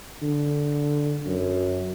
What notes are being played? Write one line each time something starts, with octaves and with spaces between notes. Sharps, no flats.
D3
F#2